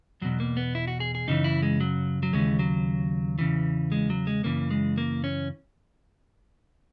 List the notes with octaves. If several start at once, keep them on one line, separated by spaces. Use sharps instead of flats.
E2 B2 F#3
A#3
B3
E4
F#4
G#4
G#4
F#2 C#3 E3 D#4
E4
G#3
F#3
F#3
D#2 C#3 E3 G#3
F#3
E2 C#3 E3
G#3
F#3
G#3
F#2 C#3 E3 A#3
G#3
A#3
C#4